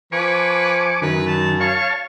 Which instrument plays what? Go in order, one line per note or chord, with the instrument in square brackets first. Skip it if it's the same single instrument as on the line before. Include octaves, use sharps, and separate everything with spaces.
[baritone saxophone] F3 [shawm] B4 [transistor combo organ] G#5 C#6 D6
[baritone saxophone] F#2 [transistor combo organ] D#3 [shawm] B4
[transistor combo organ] D#3 [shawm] A5
[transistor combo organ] C#5 F5 A5 [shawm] C#6